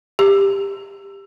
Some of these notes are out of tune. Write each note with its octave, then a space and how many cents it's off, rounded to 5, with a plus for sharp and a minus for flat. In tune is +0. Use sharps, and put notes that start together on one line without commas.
G4 +15